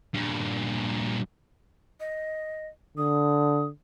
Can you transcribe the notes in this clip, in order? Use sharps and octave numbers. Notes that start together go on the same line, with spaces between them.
G2 A#2
D#5
D3 D#6